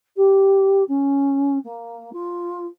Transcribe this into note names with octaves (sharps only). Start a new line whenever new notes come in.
G4
C#4
A#3
F4